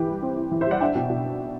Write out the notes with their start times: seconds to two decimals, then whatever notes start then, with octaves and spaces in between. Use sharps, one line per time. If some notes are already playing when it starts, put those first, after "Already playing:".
Already playing: E3 E4 G4 B4
0.08 G3
0.22 C4
0.37 E4
0.51 E3
0.61 C5 E5
0.67 G3 D5 F#5
0.81 D4 E5 G5
0.95 B2
1.10 B2